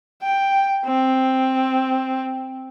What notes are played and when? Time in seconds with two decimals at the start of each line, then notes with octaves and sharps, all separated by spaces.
0.23 G5
0.86 C4